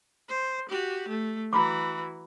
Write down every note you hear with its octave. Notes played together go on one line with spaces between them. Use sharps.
C5
F#4 G4
A3
E3 F#4 A#5 B5 D6